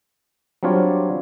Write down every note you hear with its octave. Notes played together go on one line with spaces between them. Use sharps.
F#3 G3 C4 D4 F4 C#5